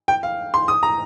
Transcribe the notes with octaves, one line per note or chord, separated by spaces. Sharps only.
G5
F5
C6
D#6
A#5